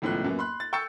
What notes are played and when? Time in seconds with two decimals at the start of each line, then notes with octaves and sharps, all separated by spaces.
0.02 G#1 C#2 A2 F3 B3 F#6
0.24 F#2 A#3 B3
0.39 B5 C6 F#6
0.60 A6
0.73 G5 C#6 E6 G6 A6 C#7